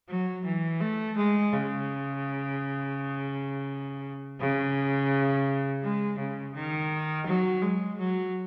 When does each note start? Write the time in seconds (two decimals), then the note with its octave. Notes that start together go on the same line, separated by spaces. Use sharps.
0.08 F#3
0.45 E3
0.81 A3
1.17 G#3
1.52 C#3
4.40 C#3
5.83 G#3
6.19 C#3
6.55 D#3
7.27 F#3
7.62 G#3
7.99 F#3